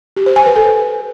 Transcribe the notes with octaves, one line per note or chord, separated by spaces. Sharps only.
G4
C5
G#5
B4
A4